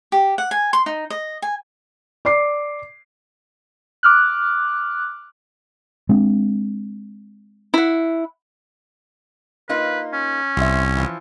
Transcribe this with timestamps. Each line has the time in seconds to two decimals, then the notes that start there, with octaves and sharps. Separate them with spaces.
0.12 G4
0.38 F#5
0.51 G#5
0.73 C6
0.86 D#4
1.10 D#5
1.42 G#5
2.25 D5 D6 C7
4.03 D6 F6 F#6
6.09 G#3 C4 D4
7.74 E4 F#5
9.69 A#3 D#4 F4 B4
10.14 C#4
10.57 C2 C4 C5 E5
10.97 E3 F3